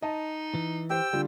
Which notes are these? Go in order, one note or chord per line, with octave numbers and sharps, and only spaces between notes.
D#4 D#5 A5
E3
G4 C5 G5 E6
D3 G3 F4